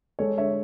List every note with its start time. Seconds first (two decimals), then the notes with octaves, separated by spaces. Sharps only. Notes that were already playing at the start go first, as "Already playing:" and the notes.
0.19 G#3 A4 C#5
0.38 D3 C#5 E5